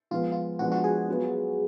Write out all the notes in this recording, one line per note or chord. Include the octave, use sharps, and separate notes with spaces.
F3 G#3 B3 F4
F4
F3 G#3 B3 D4 F#4
F#4
G#4
F#3 B3 F4